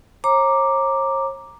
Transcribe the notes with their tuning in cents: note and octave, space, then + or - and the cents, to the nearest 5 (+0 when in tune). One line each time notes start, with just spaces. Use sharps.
C#5 -45 A#5 +0 D6 +0